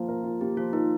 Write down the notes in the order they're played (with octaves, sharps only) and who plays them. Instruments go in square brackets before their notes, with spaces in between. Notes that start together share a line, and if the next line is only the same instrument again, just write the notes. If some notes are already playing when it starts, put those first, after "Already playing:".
Already playing: [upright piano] F3 A#3 F4
A#4
F4
[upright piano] A#3 [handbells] G4
[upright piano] F3 [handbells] F4
[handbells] D#4 [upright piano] A#4